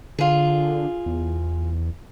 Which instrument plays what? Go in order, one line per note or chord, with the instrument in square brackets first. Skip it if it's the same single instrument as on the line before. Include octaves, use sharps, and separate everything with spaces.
[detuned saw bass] D3 [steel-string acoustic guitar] F4 G#4
[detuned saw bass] E2